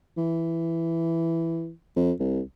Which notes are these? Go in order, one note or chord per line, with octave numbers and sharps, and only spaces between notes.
E3
F2
C2